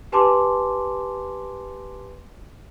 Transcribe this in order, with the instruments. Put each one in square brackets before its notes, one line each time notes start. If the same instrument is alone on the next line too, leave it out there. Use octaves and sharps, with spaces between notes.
[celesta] G4 B4 G#5 A5 C6 D6